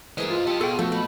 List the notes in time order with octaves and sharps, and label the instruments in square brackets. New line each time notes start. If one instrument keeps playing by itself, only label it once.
[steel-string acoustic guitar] E3 G#3 A#4 [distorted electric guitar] C5 D#5
[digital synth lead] F4
[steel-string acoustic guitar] G4 [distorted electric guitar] A4 D#5
[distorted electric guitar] B2 [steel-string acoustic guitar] G#4 [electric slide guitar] A4 G5
[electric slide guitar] F3 F#4 [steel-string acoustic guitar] A3 [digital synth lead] A4
[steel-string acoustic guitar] A3 [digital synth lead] B5